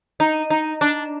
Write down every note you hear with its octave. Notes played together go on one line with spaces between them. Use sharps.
D#4
D#4
D4